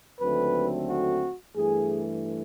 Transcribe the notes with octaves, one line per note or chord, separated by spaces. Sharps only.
D#2 D3 F#3 A3 C4 B4
F#4
G2 E3 A3 G#4